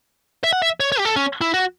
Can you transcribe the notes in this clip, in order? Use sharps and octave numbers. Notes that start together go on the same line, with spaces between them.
E5
F#5
E5
C#5
C#5
G4
A4
C#4
E4
F#4